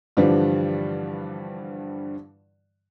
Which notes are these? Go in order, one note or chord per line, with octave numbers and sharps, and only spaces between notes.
G2 D3 E3 F3 G3